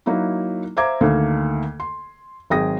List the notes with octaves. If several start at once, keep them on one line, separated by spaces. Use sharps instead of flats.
F#3 A#3 D#4 E4 F#4
C5 E5 F5 A#5 D6 G#6
D2 D#3 A3 A#3
C6
G#1 F#3 G#4 G5 D#6 A#6